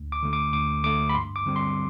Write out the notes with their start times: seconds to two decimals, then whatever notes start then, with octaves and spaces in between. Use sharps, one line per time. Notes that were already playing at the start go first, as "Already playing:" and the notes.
Already playing: D2
0.12 D6
0.23 D3 A3
0.33 D6
0.53 D2 D6
0.84 D3 A3 D6
1.09 B5
1.14 G2 C6
1.36 D6
1.46 D3 G3 C4
1.56 C6